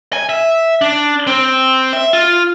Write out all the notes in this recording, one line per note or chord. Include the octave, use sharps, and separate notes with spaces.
G#5
E5
D4
C4
E5
F4